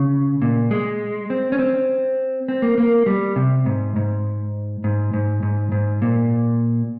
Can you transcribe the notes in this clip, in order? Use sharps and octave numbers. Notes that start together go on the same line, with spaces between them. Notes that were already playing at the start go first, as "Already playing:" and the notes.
Already playing: C#3
A#2
G#3
C4
C#4
C4
C4
A#3
A#3
G3
C3
G#2
G#2
G#2
G#2
G#2
G#2
A#2